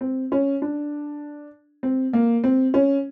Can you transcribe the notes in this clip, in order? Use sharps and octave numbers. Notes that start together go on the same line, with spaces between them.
C4
C#4
D4
C4
A#3
C4
C#4